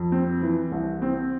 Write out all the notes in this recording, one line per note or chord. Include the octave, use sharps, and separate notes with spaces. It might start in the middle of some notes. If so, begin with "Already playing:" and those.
Already playing: F2
C4
E3
C2
C4